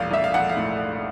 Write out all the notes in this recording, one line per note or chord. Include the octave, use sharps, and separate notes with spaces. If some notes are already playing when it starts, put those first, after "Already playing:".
Already playing: E1 A#1 F5
A#1 E5
F5
A#1 F#5
F5
A2